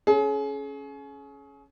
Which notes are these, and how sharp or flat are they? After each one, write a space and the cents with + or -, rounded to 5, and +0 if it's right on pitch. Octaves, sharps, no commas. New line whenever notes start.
C#4 +0 G#4 +35